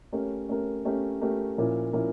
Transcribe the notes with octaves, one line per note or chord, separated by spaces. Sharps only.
A3 C#4 G4 A#4
A3 C#4 G4 A#4
A3 C#4 G4 A#4
A3 C#4 G4 A#4
A#2 F3 C#4 E4 A#4
A#2 F3 C#4 E4 A#4